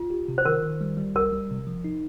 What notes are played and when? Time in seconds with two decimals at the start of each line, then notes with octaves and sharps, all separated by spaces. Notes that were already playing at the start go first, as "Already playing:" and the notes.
Already playing: F4
0.10 G4
0.28 C3
0.38 C5
0.45 D#3 A#4
0.63 D#3
0.81 G3
0.97 G3
1.15 C2 A#4
1.33 G3
1.50 C3
1.67 F3
1.84 D#4